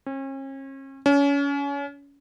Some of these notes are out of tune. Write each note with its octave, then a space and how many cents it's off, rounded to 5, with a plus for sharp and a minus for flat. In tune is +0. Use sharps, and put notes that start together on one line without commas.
C#4 -40
C#4 +30